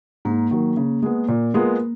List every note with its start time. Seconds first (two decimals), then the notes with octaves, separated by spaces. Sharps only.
0.25 G#2 A#3
0.51 D#3 F#3
0.77 C#3
1.02 G#3 B3
1.28 A#2
1.54 G#3 B3 F4 A#4